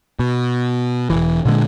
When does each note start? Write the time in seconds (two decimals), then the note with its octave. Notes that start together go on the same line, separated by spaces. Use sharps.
0.19 B2
1.10 E1 B1 E3
1.45 A#2 D3 G#3